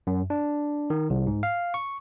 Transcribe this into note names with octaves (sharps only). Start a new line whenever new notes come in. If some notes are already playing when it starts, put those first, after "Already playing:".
F#2
D4
D#3
C2
G#2
F5
C#6